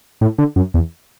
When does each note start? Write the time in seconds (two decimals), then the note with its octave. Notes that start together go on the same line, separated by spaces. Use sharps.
0.21 A2
0.38 D3
0.56 F#2
0.74 E2